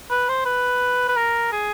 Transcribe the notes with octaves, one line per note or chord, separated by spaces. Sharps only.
B4
C5
B4
B4
A#4
G#4